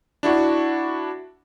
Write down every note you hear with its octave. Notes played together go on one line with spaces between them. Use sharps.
D4 E4 F#4